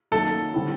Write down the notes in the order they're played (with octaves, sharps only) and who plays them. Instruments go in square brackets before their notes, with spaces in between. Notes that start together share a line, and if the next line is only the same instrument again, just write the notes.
[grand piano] F#2 D#3 F#3 A#3 [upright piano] A4
[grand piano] D3 G3 C4 E4 G4